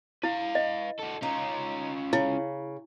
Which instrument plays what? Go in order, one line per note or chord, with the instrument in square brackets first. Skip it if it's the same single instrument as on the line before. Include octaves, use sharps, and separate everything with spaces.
[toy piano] E4 [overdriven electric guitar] B4 F5
[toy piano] D#5
[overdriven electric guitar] F#4 A4
[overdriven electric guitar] C#4 F4 [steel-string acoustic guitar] D#4
[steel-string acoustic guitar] C#3 [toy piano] E4